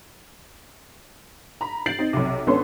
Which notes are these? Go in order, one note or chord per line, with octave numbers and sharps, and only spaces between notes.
A#5 B5
G6 A6 C7 D7 F#7
C4 D#4
B1 C3
G#1 B3 C#4 D4 A4 C6